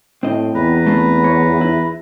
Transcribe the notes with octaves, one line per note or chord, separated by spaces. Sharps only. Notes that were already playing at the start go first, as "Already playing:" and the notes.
A2 C4 D#5
E2 B4 A#5
A3 C4
C#5
E4